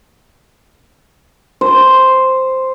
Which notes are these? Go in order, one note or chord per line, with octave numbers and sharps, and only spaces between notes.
C5